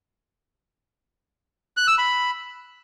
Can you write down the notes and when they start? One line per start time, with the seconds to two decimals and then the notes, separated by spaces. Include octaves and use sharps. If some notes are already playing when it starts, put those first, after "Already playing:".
1.77 F#6
1.88 E6
1.98 B5